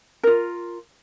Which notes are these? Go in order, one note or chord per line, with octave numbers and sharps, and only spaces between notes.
F4 A#4